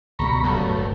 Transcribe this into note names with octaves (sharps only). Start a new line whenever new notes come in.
C#2 B2 G3 A#5 B5 C#6
D1 G2 F#3 A3
F#1